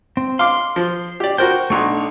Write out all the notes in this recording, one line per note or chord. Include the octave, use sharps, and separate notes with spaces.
C4
F5 C6 D6 F6
F3
G4 D5
F#4 A#4 C5 G5
B1 A3 D4 D#4 C#6